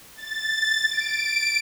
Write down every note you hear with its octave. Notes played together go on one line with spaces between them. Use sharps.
A6
D7